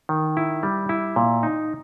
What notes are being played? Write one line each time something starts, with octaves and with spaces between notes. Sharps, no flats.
D#3
E4
G3
E4
A#2
D#4